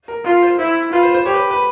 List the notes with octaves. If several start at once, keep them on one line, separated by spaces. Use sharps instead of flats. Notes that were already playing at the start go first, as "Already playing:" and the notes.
A#4
F4 A#4
C5
E4 C5
F4 B4
C5
C5
G4 C#5
B4
B4